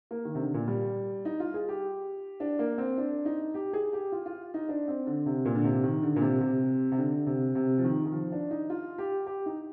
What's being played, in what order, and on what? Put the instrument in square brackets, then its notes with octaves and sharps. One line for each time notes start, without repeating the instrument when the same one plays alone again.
[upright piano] A#3
D#3
C3
D3
A#2
G3
D#4
F4
G#4
G4
D4
A#3
C4
D4
D#4
G4
G#4
G4
F4
F4
D#4
D4
C4
D3
C3
A#2
D3
C3
D#3
D3
A#2
C3
C3
C3
D3
C3
C3
F3
D#3
D#3
F3
D4
D#4
F4
G4
G4
D#4